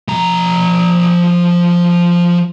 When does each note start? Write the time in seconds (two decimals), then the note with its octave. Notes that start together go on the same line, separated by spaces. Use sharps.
0.08 F3 A#5